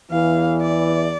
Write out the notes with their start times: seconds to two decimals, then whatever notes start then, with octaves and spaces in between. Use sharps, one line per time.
0.11 E2 E3 F5
0.61 D5